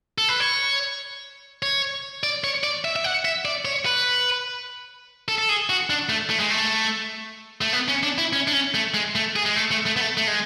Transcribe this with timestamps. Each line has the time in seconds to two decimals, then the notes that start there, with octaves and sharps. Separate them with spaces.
0.18 A4
0.29 B4
0.40 C#5
1.62 C#5
2.23 D5
2.44 C#5
2.64 D5
2.85 E5
2.96 E5
3.04 F#5
3.25 E5
3.45 D5
3.65 C#5
3.86 B4
5.28 A4
5.38 A4
5.49 G#4
5.70 F#4
5.90 D4
6.09 A3
6.30 A3
6.40 G#3
6.50 A3
7.61 A3
7.73 B3
7.88 C#4
8.03 D4
8.18 E4
8.33 C#4
8.48 D4
8.53 C#4
8.74 A3
8.94 G#3
9.15 A3
9.36 G#4
9.45 G#3
9.56 A3
9.71 A3
9.86 A3
9.96 B3
10.01 A3
10.17 A3
10.27 G#3